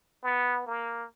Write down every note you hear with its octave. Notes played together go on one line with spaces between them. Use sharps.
B3
A#3